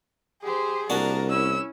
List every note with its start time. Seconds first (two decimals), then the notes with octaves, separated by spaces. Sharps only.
0.43 G4 G#4 C5
0.90 C2 A#3 D4 F#4 A#4 A5
1.30 C#4 E4 E6